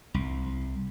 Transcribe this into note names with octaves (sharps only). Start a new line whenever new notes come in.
C2